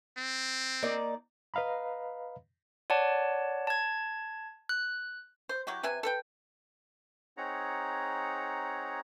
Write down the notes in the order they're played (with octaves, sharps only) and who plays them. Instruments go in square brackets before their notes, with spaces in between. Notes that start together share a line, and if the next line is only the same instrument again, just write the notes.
[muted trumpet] C4
[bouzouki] A#3 D#4 D5
[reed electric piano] B4 D#5 F5 A#5 B5
[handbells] C#5 D5 F#5 A5
A5 G#6
F#6
[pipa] C5
F#3 E4 F#4 G4
C3 B4 E5 G#5
A4 B4 G5
[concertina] C4 D#4 G#4 C#5 F#5 A#5